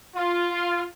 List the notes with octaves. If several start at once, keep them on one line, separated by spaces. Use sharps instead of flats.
F4